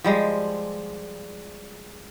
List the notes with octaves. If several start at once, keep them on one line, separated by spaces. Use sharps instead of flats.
F3 G3 G#3